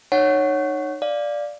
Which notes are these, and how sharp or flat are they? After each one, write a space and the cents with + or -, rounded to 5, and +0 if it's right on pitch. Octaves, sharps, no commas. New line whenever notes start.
D#4 -30 C#5 +0 F#5 +0
D5 +0 F5 +5